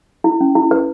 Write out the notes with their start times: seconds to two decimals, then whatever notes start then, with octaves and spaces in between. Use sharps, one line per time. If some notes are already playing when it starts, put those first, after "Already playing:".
0.24 E4
0.41 C#4
0.55 E4
0.71 B4